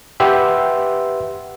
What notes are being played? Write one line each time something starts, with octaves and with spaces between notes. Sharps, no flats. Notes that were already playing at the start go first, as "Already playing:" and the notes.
G4 B4 E5 F#5 C6 E6